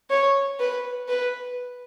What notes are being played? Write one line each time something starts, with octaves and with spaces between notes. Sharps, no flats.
C#5
B4
B4